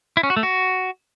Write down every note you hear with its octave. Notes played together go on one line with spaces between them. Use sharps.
E4
C#4
F#4
A3
F#4